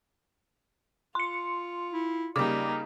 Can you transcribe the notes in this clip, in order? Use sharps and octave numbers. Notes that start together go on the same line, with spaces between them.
F4 C6 C#7
E4
C#3 G3 A#3 D#4 D5 D6